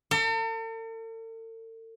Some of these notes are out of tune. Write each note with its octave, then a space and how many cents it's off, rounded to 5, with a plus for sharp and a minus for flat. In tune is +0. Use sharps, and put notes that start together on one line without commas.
A4 +45